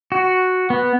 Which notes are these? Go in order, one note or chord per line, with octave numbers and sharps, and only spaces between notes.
F#4
B3